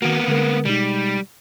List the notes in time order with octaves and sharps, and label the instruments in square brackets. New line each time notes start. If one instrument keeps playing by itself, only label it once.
[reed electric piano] D#3 F#4 [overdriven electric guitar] A#3 B3
[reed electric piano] D3 G#3 A#4
[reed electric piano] B2 G#3 D#4 [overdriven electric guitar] G3